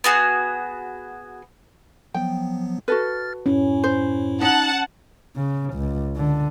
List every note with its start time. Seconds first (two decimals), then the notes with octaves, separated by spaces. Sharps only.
0.04 B3 F#4 G#4
2.14 F3 F#3 B3 G5
2.88 F#4 A4 B4 F6 A6
3.46 F#2 A2 C#4 E4
3.84 C5
4.41 D#4 F#5 A5
5.37 C#3
5.75 C#2
6.17 D3